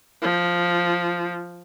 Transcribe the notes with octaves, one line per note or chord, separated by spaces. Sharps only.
F3